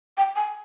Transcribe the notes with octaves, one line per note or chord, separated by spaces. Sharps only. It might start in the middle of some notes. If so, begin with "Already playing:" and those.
G5
G#5